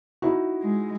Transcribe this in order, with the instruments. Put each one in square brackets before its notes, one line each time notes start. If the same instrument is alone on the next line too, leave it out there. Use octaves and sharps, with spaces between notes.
[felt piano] D#4 E4 F#4
[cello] G#3